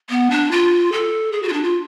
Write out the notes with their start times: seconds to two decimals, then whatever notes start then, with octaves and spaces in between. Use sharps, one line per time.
0.10 B3
0.31 D4
0.51 F4
0.92 A4
1.32 G#4
1.43 F#4
1.48 F4
1.53 D4
1.63 F4